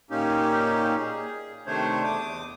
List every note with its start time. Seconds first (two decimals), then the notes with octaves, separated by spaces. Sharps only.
0.11 A#2 A#3 C#4 D#4 G4
0.99 G#4
1.66 C3 D#3 A3 D4 C5 C#5
2.04 E2 D6 D#6